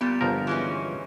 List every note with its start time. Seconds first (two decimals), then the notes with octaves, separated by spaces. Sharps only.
0.01 A#2 G3 B3
0.21 G1 F3 A#4
0.47 E3 G#3 C#4